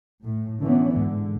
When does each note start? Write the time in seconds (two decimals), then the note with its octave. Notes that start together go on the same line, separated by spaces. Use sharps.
0.23 A2
0.62 D3 E3 B3 C#4
0.96 G#2 D3